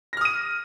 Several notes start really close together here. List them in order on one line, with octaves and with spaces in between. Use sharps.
A#6 F6 D#6 D#7